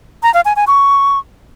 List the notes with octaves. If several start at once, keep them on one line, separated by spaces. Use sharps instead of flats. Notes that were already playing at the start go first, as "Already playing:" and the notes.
A#5
F5
G#5
G#5
C#6